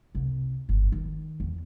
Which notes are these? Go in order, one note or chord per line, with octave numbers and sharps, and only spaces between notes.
C2
G1
D#3
E2